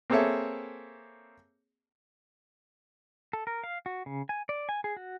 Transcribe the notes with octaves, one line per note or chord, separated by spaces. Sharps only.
A#3 C4 G#4 A4 C#5 E5
A4
A#4
F5
F#4
C#3
G#5
D5
G#5
G#4
F#4